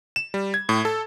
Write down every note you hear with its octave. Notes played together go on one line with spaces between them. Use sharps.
E7
G3
G#6
A2
A4